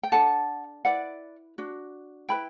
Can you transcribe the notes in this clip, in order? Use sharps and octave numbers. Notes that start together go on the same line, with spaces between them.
G5
D4 A4 F#5 A5
E4 B4 D5 F#5
D4 F#4
E4 B4 G5 B5